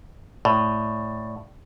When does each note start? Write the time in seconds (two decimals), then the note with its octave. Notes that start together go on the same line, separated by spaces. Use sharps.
0.45 A2 D5